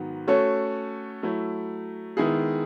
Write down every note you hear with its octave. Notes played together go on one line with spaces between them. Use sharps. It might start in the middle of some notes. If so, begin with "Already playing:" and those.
Already playing: G#2 D#3 F#3 B3
A3 C#4 F#4 A4 C#5
F#3 A3 E4
D#3 G#3 B3 E4 G#4